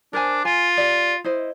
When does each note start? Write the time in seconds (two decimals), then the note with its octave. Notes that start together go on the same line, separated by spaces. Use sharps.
0.13 D4 A#4 C5 G#5
0.45 F4 G#5
0.77 G4 D5
1.24 E4 C5 D#5